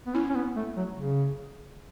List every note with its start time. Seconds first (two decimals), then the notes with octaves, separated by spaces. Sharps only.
0.06 B3
0.15 C#4 E4
0.30 C#4
0.35 B3
0.56 A3
0.77 F#3
0.97 C#3